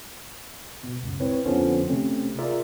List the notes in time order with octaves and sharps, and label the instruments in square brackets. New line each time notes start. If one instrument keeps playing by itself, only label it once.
[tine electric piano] B2
C#2 F#2
C4 E4 B4 C#5
F2 D3 F3 B3 C#4
C3 A3 C#4
F4 G#4 A#4 D5 E5